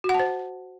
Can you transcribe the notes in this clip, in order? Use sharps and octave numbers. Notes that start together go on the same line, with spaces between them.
F#4
F#5
A5
C5